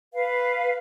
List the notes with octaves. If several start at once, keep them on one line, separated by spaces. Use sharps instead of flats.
B4 F5